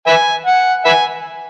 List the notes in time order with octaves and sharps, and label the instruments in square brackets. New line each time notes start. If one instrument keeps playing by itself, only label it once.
[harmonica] B4 E5 G#5
F#5
B4 E5 G#5